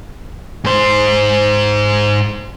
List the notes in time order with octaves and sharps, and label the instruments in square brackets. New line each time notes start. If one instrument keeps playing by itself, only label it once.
[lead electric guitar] G#2 C5